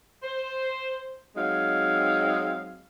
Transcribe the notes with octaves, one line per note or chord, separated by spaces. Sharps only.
C5
F#3 G#3 C4 D#4 F5